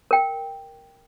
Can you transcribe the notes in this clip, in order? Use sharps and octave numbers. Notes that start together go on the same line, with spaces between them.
A#4 G5